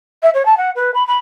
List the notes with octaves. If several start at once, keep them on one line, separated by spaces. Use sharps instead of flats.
E5
C#5
A5
F#5
B4
B5
B5